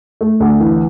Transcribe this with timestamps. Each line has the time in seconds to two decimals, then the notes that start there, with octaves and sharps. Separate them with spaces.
0.21 A3
0.40 D2
0.60 E3